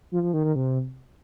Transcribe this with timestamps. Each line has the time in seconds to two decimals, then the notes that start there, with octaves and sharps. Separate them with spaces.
0.11 F3
0.22 F3
0.33 D#3
0.44 D#3
0.55 C3